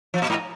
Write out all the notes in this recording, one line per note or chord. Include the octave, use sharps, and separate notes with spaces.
F3
A#2
G#2